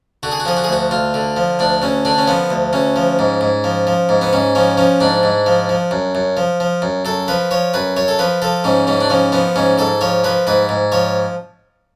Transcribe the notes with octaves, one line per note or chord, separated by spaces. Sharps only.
D3 F#4
G#4
F#4
F3 G#4
F#4
G#4
D2 F#4
D2 F4
D3
F3
D2 D4
D2 C#4
D3 D4
C#4
F3 B3
D2
D2 C#4
F3
G#2
G#2
F3
F3
G#2
B3
G#2 C#4
F3 C#4
F3 C#4
G#2 D4
G#2
F3
F3
F#2
F#2
F3
F3
F#2
F#2 A4
F3 B4
F3 C#5
F#2 B4
F#2 C#5
A4
F3 B4
F3 A4
G#2 C#4
G#2 C#4
D4
F3 C#4
F3 B3
G#2 C#4
G#2 A4
F3 C#5
F3 B4
G#2 B4
G#2
F3 C#5